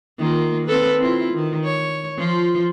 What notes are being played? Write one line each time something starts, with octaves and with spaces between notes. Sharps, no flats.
D#3 A#3 F4
C4 A4 B4
C4 E4 F4
D#3
C#5
F3 F4